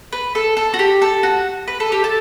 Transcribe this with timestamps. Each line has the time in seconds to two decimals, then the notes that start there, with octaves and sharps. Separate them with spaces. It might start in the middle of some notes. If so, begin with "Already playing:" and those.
0.12 B4
0.35 A4
0.57 A4
0.74 F#4
0.79 G4
1.02 A4
1.23 F#4
1.68 B4
1.80 A4
1.92 G4
2.04 A4